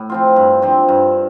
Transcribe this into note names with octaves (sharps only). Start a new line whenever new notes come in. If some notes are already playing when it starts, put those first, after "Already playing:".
Already playing: A2
F3 C4 F4
G2
F3 C4
G2